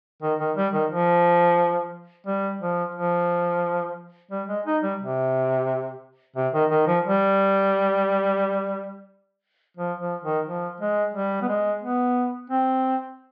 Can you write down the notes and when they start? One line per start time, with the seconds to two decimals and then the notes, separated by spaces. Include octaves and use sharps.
0.22 D#3
0.39 D#3
0.57 G3
0.73 D#3
0.91 F3
2.26 G3
2.61 F3
2.95 F3
4.31 G3
4.48 G#3
4.66 D#4
4.83 G3
5.00 C3
6.36 C3
6.53 D#3
6.70 D#3
6.87 F3
7.05 G3
9.77 F3
10.00 F3
10.23 D#3
10.46 F3
10.80 G#3
11.14 G3
11.42 B3
11.49 G#3
11.82 B3
12.50 C4